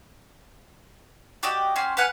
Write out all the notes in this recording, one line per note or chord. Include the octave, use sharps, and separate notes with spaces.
F#4 G4 D5 D#5
C#4 F#4 G4 C6
B4 F5 F#5 G#5